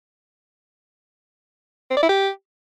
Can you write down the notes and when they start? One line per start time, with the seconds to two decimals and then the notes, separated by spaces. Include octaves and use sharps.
1.91 C4
1.97 D5
2.03 E4
2.09 G4